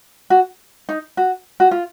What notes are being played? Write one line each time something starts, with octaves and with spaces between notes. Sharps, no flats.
F#4
D#4
F#4
F#4
F4